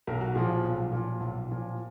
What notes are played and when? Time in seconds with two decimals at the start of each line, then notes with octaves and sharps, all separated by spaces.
0.07 B1 A#4
0.21 F#4
0.35 A#2 F3 G#4
0.49 F4
0.64 B1
0.92 A#2 F3
1.20 B1
1.49 A#2 F3